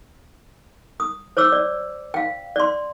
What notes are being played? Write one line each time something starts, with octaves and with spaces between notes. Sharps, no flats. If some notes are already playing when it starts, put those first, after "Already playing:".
D#6
C5 C#5 D6 E6
D5
F5 G5
D5 C6